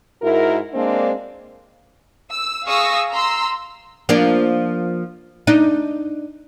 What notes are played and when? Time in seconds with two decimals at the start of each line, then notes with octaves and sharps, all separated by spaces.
0.22 G#2 E4 F#4 A#4
0.73 G#3 A#3 C4 D4
2.30 E6
2.66 G#4 F5 C#6 D#6 E6 A#6
3.12 A#5 C6 E6
4.09 F3 A#3 D4
5.47 D4 D#4